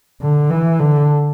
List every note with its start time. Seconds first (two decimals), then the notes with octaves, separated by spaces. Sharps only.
0.21 D3
0.50 E3
0.80 D3